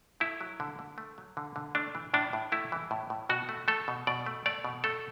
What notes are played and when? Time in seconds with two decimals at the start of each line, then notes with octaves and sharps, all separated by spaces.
0.20 A3 E4
0.41 F#3
0.60 D3
0.79 D3
0.98 A3
1.18 F#3
1.37 D3
1.56 D3
1.75 A3 D4
1.95 E3
2.14 A2 D4
2.33 A2
2.52 A3 E4
2.72 E3
2.91 A2
3.10 A2
3.29 B2 F#4
3.49 A3
3.68 A3 A4
3.88 B2
4.07 B2 D5
4.26 A3
4.46 A3 D5
4.65 B2
4.84 A3 A4